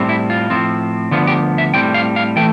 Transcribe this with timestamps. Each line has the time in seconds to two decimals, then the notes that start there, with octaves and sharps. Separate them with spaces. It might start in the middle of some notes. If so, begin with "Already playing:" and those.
Already playing: A2 G3 C4
0.09 E4
0.30 F4
0.50 A2 F3 C4
1.11 D2 D3 F3 B3 F4
1.27 G4
1.58 E5
1.74 A2 G3 C4 G5
1.94 F5
2.16 F5
2.37 E3 A3 G5